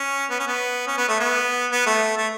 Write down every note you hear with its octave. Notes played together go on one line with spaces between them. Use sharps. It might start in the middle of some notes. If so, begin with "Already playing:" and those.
Already playing: C#4
B3
C#4
B3
C#4
B3
A3
B3
B3
A3
A3